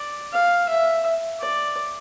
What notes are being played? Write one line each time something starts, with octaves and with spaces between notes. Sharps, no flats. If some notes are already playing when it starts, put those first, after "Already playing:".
Already playing: D5
F5
E5
D5